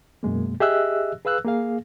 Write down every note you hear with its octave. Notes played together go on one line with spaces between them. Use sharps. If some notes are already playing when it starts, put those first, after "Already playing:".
F#2 B2 G#3 A#3
G4 G#4 D#5 E5 E6 F#6
G#4 B4 F5 E6 F#6
A#3 G#4 F5